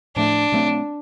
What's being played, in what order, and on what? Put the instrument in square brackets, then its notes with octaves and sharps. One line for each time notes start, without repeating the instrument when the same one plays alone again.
[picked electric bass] A2 F3 A3 [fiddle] D4
[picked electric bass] B2 F#3 A3 C4